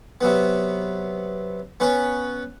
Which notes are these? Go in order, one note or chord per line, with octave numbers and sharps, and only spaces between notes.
C3 F#3 B3
B3 C#4 B4